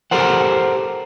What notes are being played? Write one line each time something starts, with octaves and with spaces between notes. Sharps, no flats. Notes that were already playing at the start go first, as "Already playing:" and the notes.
G4 A4 A#4 C5 F#5